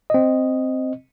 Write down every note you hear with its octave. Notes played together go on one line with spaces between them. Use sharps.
C4 D#5